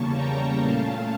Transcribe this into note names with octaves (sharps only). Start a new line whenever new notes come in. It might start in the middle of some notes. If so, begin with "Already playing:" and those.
Already playing: E2 C#3 G3 A#3 C#4 A5 C#6
G5 A#5
A#2 A3 C#4 F5 A5